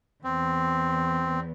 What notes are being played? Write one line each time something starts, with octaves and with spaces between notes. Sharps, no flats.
E2 C4